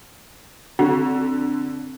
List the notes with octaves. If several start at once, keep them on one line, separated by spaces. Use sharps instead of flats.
D3 C4 F#4